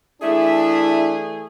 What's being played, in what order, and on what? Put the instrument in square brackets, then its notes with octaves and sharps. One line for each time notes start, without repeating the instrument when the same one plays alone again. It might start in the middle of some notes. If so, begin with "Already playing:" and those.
[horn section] E3 A3 G#4 [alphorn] D4 [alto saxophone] E4 [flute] E5